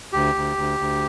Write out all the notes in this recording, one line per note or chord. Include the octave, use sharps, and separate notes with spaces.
D2 G4
D2
D2
D2